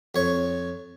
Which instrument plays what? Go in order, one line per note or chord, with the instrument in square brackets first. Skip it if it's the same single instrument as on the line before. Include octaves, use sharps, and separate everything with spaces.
[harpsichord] F2 C#5